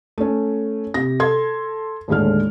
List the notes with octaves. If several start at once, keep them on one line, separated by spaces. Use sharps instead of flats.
A3 C#4
C3 A#6
A4 C6 G#6
D#2 A2 D3 G#3 F6